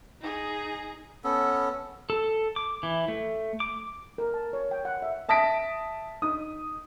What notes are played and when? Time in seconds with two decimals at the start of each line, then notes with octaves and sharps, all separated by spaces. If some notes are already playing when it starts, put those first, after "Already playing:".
0.21 D#4 G#4
1.24 B3 C#4 A4
2.10 A4
2.56 D6
2.83 E3
3.08 A3
3.60 D6
4.18 A#4
4.34 A5
4.53 C#5
4.71 G5
4.85 F#5
5.02 E5
5.29 E5 A5 D#6 A#6 B6 D7
6.22 D#4 D#6